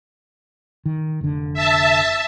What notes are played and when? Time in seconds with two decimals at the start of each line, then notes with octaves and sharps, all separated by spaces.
0.86 D#3
1.21 F1 D3
1.54 E5 A5